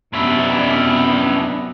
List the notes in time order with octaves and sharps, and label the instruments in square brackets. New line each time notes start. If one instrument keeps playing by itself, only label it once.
[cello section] F#2 C3 B3 [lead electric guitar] C#4 E5 [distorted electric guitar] D4 E4